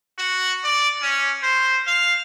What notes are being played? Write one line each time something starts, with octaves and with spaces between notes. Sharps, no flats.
F#4
D5
C#4
C5
F5